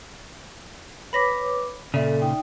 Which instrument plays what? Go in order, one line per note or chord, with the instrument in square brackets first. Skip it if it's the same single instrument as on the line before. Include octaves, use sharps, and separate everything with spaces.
[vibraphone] B4 C#5 D6 [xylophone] B5 A#6 B6
[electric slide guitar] A#2 C#3 [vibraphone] A4 [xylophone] D5 E5
[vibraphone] D#4 G5